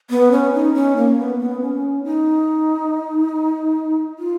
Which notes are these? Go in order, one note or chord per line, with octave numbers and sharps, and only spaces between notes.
B3
C#4
D#4
C#4
A#3
B3
B3
C#4
D#4
F4